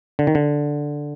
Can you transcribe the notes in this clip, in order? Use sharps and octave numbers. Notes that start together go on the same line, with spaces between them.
D3
D#3
D3